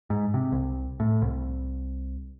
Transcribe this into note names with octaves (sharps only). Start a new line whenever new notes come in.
G#2
C3
C2
A2
C2